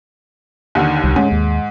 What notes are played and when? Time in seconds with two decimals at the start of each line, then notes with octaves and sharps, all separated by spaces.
0.75 D#2 D3 D#3
1.04 C2
1.16 G#2 C#4
1.32 D#2